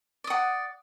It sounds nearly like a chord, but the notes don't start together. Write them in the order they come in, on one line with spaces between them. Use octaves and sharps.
D5 D#6 F#5